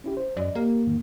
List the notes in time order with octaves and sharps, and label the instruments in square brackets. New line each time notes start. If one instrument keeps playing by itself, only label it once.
[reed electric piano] C#4 E4 G4
C5
[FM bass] F#2 [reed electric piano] D5 D#5
[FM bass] A#3 [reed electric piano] G4 A#4
[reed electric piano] E2 G#2 D#3